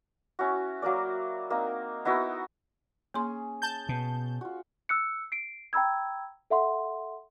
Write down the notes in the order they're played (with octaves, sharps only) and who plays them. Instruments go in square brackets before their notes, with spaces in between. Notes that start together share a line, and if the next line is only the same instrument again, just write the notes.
[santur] C#4 E4 F#4
F#3 A#3 A#4 D5
A#3 C4 D#4
B3 D#4 E4 F#4
[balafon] A#3 C6 [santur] C#4 G#4
[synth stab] A5 G6
[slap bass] B2
[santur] F4 F#4
[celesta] E6 F#6 C#7
C7 D7
G5 A#5 B5 E6 G#6
A4 E5 F#5 C6